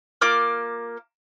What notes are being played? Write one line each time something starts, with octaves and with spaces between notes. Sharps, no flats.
A#3 F4 D6 F6